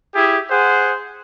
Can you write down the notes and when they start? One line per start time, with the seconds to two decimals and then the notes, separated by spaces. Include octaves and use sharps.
0.14 E4 G4 G#4
0.50 G#4 C5 F#5